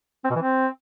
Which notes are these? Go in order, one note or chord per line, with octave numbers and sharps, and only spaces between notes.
C4
B2
E3
C4